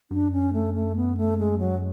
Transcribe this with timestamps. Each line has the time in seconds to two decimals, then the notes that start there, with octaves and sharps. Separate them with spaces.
0.11 F#2 D4
0.32 C#4
0.53 A3
0.74 A3
0.96 B3
1.17 A3
1.38 G#3
1.59 F#3